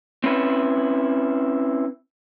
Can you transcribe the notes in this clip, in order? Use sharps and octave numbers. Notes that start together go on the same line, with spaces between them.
C4 C#4 E4 B4